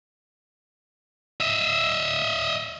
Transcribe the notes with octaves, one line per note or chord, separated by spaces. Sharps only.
D#5 E5